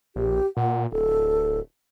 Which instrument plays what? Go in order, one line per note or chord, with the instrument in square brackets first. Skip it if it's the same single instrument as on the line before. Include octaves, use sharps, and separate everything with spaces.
[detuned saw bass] A#1 [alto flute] G4
[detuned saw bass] A#2 [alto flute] F#5
[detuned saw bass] D1 [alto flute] A4